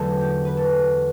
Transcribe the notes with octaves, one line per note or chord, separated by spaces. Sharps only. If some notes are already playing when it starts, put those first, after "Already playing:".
Already playing: E2 D3 F#3 A3 A4
G4
B4
A4